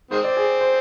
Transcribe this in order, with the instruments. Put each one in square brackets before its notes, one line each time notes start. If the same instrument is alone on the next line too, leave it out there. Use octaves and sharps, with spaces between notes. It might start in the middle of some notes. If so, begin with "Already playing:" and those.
[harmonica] D#3 G#3 C4 [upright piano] C5
[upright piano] D5
G#4
C5